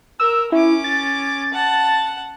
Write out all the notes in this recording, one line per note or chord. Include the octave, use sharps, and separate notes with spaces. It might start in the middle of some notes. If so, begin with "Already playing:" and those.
A#4 E6
C#4 E4 D6
A6
F#5 A5